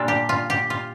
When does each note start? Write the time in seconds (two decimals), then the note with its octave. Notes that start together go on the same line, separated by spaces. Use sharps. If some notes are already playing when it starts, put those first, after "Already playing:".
Already playing: A#2 G3 D4 F4 A4
0.08 G4
0.29 F4
0.50 G4
0.70 F4